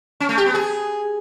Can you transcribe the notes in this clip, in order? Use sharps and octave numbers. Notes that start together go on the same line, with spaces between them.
C#4
A3
G4
B3
G#4